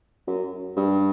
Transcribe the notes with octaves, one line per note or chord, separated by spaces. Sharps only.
F#2
G2